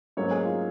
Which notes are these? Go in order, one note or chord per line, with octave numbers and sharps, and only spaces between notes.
G#2 F#3 A#3 C#4 C#5
G#4
F4